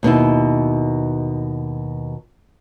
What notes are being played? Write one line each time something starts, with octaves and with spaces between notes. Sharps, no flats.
D#2 B2 D#4 E4